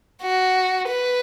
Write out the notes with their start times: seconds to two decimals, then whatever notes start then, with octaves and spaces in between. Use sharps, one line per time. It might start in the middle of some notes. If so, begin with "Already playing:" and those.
0.23 F#4
0.89 B4